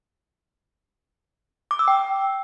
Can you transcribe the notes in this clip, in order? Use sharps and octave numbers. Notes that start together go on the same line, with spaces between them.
D6
E6
G5